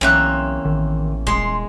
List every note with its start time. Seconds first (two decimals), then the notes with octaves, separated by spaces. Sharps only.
0.01 B1 E2 A#3 C4 C#4 E5 F#6
0.65 A1 D#3
1.27 D#1 G#3 G#4 C6